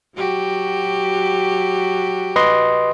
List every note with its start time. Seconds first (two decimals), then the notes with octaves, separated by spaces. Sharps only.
0.17 F#3 F#4 G4
2.36 B4 D#5 C6